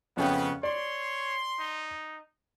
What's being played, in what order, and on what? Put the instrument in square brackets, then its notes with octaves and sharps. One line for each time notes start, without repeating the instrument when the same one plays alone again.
[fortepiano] F2 C#4 G5 [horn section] C#3 B3 [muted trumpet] F#5
[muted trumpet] C#5 [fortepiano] D5 [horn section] C6
[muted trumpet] D#4